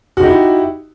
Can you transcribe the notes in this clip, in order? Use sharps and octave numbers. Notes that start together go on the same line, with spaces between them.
D#4 E4 F#4 G4